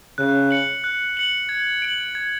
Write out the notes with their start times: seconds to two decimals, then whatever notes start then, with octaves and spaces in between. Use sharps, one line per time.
0.18 C#3 F#6
0.51 C#7 F#7
0.84 F#6
1.17 C#7 F#7
1.49 G#6
1.82 D7 F#7
2.15 G#6